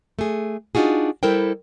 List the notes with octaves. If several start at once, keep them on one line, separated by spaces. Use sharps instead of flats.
A3 G#4
D4 D#4 F4 F#4 G#4
G3 E4 A4 A#4 C5 G5